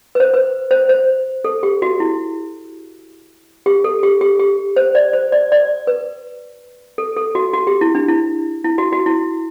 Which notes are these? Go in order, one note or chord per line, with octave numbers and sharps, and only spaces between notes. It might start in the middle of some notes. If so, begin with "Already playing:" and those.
B4
C5
B4
C5
C5
A4
G4
F#4
E4
G4
A4
G4
G4
G4
C5
D5
C5
D5
D5
B4
A4
A4
F#4
F#4
G4
E4
D4
E4
E4
F#4
F#4
E4